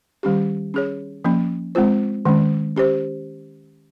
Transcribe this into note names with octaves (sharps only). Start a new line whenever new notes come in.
D#3 G3 C#4 G4
C#4 G#4 C#5
F3 A#3 C#4
G#3 C4 F4 C5
D#3 G#3 C#4
C#4 G4 C5